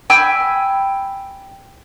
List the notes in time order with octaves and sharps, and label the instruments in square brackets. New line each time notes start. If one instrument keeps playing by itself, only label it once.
[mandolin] G5 G#5 B5 E6